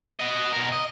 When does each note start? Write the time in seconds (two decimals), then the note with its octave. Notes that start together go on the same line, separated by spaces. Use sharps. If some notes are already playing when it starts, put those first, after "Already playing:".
0.19 F#4 D#5
0.53 B2 A#4
0.72 D#5